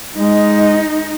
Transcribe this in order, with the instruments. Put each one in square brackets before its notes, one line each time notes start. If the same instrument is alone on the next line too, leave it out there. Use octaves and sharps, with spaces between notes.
[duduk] G#3 [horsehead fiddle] D#4